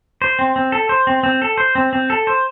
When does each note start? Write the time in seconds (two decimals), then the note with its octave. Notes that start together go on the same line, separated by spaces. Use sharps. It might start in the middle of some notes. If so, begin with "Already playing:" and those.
0.22 C5
0.39 C4
0.56 C4
0.72 A4
0.89 C5
1.07 C4
1.23 C4
1.42 A4
1.58 C5
1.75 C4
1.93 C4
2.10 A4
2.27 C5